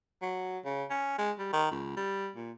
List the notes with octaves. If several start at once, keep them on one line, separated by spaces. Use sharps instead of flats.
F#3
C#3
C#4
G#3
G3
D#3
C#2
G3
A#2